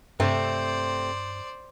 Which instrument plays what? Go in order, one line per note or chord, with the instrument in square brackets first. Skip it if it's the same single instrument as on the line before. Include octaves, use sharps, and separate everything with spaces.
[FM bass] G2 [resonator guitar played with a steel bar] C3 A3 C4 [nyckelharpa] C5 D5